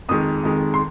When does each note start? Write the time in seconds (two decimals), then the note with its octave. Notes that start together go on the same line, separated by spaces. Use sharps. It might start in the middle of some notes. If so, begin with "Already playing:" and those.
0.09 F2 D#3 G#3 D#6
0.43 F2 D#3 G#3
0.74 C6